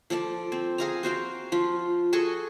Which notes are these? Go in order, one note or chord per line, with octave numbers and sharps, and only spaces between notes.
F3 A4 D5 A5
C4
G#4 F5 A#5
F#4 C5 F5 G5
F3 F4
F#4 G#4 A4 C#6